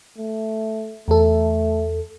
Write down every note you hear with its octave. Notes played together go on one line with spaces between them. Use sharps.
A3
E2 A3 A4